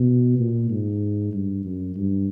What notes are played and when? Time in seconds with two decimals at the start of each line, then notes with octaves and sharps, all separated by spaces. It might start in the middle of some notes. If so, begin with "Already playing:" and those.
Already playing: B2
0.39 A#2
0.70 G#2
1.33 G2
1.64 F#2
1.96 G2